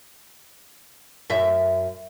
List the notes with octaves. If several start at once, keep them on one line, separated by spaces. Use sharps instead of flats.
F#2 E5